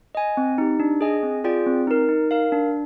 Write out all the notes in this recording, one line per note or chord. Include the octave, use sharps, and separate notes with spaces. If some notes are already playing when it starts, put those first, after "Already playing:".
D#5 G#5
C4
D#4 G4
D4
G#4 D#5 G#5
C4
F4 G#4 D5 G5
C4
D#4 A#4
D#4
A#4 F5
D4